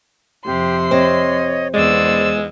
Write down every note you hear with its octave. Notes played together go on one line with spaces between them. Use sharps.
F2 C3 G4 C6
C4 C#5 D#5
E2 G#3 B3 C5 D5 E6